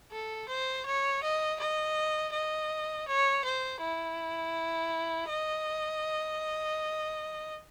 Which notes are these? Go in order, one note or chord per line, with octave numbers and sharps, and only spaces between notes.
A4
C5
C#5
D#5
D#5
D#5
C#5
C5
E4
D#5